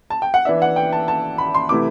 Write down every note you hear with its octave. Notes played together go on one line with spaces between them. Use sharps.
A5
G5
F#5
E3 B3 D4 E5
F#5
G5
A5
A5
B5
C6
C3 E3 A3 E4 D6